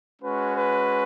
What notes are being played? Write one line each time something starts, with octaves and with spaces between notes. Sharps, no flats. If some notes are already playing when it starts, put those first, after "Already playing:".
G#3 C#4 F#4 B4
B4